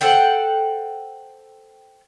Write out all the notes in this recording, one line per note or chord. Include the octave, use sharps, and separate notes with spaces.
A4 C5 F#5 G5